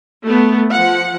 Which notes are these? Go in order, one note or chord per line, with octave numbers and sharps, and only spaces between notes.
A3 B3
F3 F#5